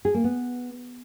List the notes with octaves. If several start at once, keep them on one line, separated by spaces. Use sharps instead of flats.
G#4
A#3
B3